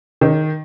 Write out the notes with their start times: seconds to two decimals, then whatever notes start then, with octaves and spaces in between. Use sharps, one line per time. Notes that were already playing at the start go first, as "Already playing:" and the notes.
0.21 D#3